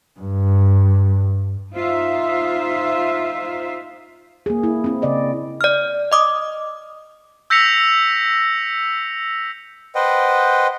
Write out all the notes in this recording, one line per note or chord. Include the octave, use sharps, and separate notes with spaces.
G2
D#4 F4 C5 E5
A#3 G#4
E4
C4 E4
C#3 D5 D#5
D5 F6
D#5 D6 D#6
E6 G6 A#6 B6 C#7 F7
B4 C5 D#5 F#5 G5